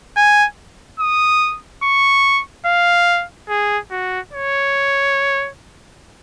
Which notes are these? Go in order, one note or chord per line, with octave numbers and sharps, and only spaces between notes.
G#5
D#6
C#6
F5
G#4
F#4
C#5